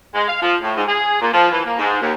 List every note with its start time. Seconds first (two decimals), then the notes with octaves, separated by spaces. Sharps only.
0.14 G#3
0.28 F5
0.41 F3
0.61 A2
0.75 G#2
0.87 G#4
1.20 A#2
1.32 F3
1.52 E3
1.64 A#3
1.78 G#2
2.01 D#2